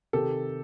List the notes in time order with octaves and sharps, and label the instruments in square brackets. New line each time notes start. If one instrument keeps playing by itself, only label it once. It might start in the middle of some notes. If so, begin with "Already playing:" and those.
[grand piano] C3 D#3 G4 A4